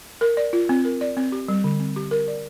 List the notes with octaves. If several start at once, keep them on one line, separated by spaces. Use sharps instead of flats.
A#4
D5
F4
C4
A#4
D5
C4
G4
G3
D3
C4
G4
A#4
D5